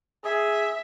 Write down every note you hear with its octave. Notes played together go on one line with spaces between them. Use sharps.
G#4 E5